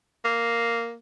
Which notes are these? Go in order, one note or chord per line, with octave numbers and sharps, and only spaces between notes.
A#3